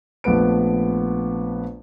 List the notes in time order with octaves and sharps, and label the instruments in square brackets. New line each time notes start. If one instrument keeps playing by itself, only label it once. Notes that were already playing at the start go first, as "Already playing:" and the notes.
[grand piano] A#1 A3 B3 B4 D7